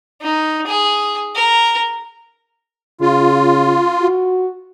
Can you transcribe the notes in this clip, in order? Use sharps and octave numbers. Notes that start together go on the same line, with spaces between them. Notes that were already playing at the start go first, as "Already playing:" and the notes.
D#4
G#4
A#4
C#3 F4
F#4